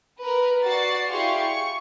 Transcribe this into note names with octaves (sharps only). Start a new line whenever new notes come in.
A#4 B4
F#4 D5 A6 C7
E4 G4 G#4 F5 C6 C#6
C#6